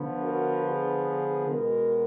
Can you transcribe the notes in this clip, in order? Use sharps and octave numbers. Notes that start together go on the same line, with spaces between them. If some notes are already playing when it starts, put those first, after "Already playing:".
Already playing: D3 F3 B3
F#4 A#4
G#4 B4
B2 G#3 B3 F#4 A#4